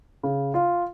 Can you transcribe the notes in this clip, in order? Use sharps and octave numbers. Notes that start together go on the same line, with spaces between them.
C#3
F4